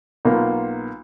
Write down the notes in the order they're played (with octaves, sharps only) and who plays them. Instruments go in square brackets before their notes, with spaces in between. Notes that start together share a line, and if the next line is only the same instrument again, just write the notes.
[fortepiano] B1 A#3 F4